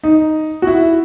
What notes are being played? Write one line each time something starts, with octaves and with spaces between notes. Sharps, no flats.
D#4
F#4
E4